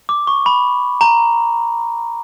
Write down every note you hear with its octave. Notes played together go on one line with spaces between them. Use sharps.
D6
C#6
B5
A#5